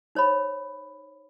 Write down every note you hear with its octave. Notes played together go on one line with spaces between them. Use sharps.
D#4 C5 C#5 B5